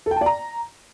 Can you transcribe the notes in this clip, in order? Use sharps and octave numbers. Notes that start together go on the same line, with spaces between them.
A4
G5
A5
D5
A#5